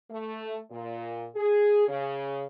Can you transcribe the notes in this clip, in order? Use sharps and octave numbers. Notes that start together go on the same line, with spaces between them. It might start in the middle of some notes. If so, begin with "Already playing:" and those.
A3
A#2
G#4
C#3